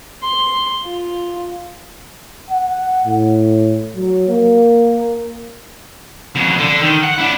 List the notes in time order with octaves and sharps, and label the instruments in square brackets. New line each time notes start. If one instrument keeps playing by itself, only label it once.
[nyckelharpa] C6
F4
[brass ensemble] F#5
A2
F#3
A#3
[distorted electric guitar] F2 B2
D3 A4
D#3
F#5
D4 E4